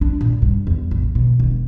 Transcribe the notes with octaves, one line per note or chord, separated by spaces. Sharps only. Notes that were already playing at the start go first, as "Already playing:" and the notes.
D4
A#2
G2
E2
A1
B2
E1